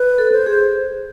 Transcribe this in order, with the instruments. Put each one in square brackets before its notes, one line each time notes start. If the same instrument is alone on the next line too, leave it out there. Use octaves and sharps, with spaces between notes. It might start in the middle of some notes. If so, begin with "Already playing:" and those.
Already playing: [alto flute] B4
[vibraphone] A4
[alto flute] C5
[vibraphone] G#4